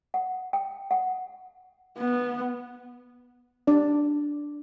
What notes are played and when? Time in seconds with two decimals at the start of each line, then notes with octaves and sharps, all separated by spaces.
0.14 F#5
0.53 G5
0.91 F#5
1.98 B3
3.67 D4 D5